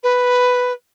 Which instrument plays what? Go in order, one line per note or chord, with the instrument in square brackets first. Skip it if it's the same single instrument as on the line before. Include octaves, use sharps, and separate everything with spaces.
[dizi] B4